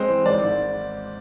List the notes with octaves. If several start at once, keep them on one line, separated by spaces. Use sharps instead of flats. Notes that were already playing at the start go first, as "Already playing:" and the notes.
Already playing: G#3 C4 C5
E3
G#1 D5
G#2